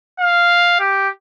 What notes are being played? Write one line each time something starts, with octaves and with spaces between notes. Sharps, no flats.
F5
G4